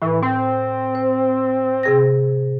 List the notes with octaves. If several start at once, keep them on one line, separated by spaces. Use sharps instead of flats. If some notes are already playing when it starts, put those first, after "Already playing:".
A2 E3
C4
C5
C3 G#4 A#6